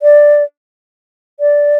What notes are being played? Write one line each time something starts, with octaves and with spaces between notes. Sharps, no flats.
D5
D5